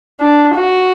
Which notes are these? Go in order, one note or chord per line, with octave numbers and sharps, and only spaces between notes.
D4
F#4